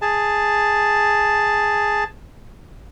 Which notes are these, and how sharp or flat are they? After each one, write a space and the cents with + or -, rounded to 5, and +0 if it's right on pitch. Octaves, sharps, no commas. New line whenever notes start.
G#4 +0 A5 +0